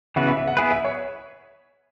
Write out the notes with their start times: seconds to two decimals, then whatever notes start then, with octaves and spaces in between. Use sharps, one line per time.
0.16 C#3 E3 B3 F#4 B4 E5
0.27 E5
0.37 E5
0.47 F#5
0.57 B3 E4 G#4 B4 E5
0.71 E5
0.85 C#5